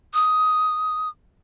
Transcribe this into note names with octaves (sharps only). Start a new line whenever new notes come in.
D#6